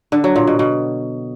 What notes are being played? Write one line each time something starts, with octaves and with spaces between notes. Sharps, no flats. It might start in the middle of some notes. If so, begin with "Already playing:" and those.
D3
F#3
A#2
B2
B2